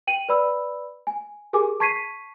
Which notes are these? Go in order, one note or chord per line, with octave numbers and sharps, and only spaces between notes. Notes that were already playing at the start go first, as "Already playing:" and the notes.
G5 D#7 F#7
B4 D5 B5 E6
G#5
G4 G#4 A#4 G#5 D6
A5 C#6 G#6 B6 C7 D#7